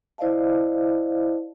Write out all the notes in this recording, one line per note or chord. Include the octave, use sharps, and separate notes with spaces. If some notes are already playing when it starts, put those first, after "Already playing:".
E4 C5 D5 D#5 F5 A5